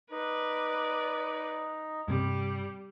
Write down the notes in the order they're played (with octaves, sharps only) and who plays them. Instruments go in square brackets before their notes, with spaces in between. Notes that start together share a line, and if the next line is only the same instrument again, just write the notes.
[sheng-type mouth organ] D#4 [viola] B4 D5
[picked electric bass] G2 C3 [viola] G3